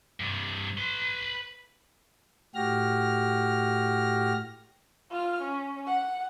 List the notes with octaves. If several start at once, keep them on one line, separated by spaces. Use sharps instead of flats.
G2 C3
B4 C6
A2 F#4 G4 F6 A#6
F4 F6
C#4
F#5